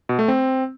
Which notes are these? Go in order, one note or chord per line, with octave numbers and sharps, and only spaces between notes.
B2
A3
C4